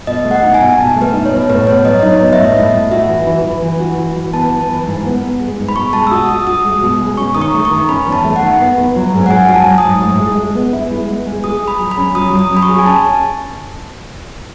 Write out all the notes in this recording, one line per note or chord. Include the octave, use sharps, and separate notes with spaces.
B2 D#5
A3
F#5
D#4
G#5
B2
B2 A5
A3
B4
D#4
C#5
B2
A2 B4
B3 C#5
F#3 D#5
D#5
D#4 C#5
B3 D#5
E5
A2
D#5
A2
A2
F#4 E5
E3
E3
E3
E3
F#4
E3
E3
B3 A5
E3
E3
G#2
B3
B3
G#3
G#2
B5
B2 C#6
G#3 A5
E6
F#4 D#6
F#4 D#6
F#4 D#6
G#3
B2
G#3
C#4 C#6
D#3 D#6
C#6
A3
C#6
D#3
C#4 B5
E2
A5
A3
F#5
D#3
B3
B3
F#3
G#2
F#5
G#2 G#5
F#3 G#5
A5
F#3
D#6
G#2
A2
G#3
G#3
B3
E4
G#3
B3
G#3
G#4 D#6
G#4
B5
F#3
B5
C#4
F#3 D#6
F#3
D#6
C#4
B5
C#6
G#4
G#5
C#4 A5